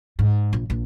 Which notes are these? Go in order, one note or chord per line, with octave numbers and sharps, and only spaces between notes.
G#2
A#1
A#1